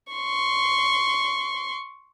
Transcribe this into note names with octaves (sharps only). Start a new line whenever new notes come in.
C6 C#6